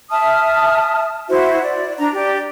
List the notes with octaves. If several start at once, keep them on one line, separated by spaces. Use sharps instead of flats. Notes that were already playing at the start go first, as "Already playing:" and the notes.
E5 A5 D#6 F6
E4 F#4 C5 E5
D5
D4 A#5
G4 D5